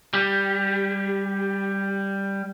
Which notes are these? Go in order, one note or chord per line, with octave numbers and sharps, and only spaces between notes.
G3 G4